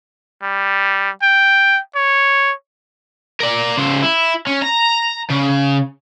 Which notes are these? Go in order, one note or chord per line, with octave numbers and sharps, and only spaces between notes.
G3
G5
C#5
A#4 D5
C#3 C5
E4
C#4
A#5
C#3